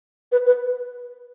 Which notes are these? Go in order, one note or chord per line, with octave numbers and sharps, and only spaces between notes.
B4
B4